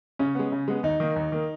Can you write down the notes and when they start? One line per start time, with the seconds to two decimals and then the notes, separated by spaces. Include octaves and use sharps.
0.19 C#3 C#4
0.35 G#3 B3
0.52 C#3
0.68 G#3 B3
0.83 D#2 D#4
1.00 D#3 A#3
1.16 D#2
1.32 D#3 A#3